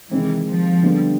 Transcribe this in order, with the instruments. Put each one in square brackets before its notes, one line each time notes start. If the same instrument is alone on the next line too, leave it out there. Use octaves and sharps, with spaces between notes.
[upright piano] C3 D#3 G#3 C4 [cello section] E3
[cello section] F3
[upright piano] D3 G3 B3 D4 G4